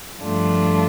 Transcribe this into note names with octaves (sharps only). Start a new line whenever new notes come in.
G2 F3 A3 D4 F4